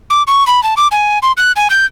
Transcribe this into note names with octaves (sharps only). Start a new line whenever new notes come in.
D6
C#6
B5
A5
D6
G#5
C6
F#6
G#5
G6